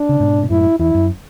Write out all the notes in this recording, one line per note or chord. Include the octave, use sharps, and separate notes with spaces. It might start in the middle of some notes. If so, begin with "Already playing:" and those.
Already playing: D4
C#3
G#2 B2
B2
F#2 A2 E4
E2 E4
F#2